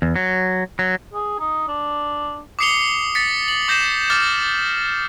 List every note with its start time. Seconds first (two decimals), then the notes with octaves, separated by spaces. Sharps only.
0.02 E2
0.16 F#3
0.79 F#3
1.13 G#4
1.39 D#4
1.68 D4
2.59 D6 D#6 C7 C#7 F7 G7
3.15 A6 B6 C#7
3.48 F#7
3.68 D6 G6 A#6 C7 E7
4.10 D6 F6 A6